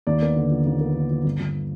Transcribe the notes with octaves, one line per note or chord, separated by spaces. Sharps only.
D#2 D5
B3
D3
F3
D#2
B3
D3
F3
G1
G1